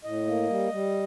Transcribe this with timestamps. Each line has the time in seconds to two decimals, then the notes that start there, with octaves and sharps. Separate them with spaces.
0.04 A2 D#5
0.27 A#3
0.49 G3
0.72 G3